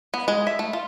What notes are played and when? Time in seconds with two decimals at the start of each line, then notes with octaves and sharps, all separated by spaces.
0.14 B3
0.28 G#3
0.47 E5
0.59 A3
0.73 F4